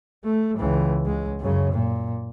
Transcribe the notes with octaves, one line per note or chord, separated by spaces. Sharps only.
A3
C#2 E3
C#2 G#3
F#2 C#3
A#2